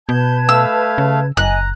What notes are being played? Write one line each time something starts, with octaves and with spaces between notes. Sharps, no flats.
B2 B4 A5 G6 G#6
A3 F5 E6
C#3
F#1 D#5 G#5 A#5 F#6